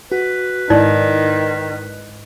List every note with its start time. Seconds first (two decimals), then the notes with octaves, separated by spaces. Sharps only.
0.12 F#4 B4
0.70 G#2 D#3 D#4 E4 D5